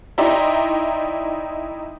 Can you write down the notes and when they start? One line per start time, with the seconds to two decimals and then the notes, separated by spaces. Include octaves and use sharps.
0.18 D#4 E4 D5 G5 A#5 C6